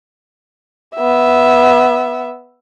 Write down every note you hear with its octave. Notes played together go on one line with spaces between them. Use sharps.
B3 E5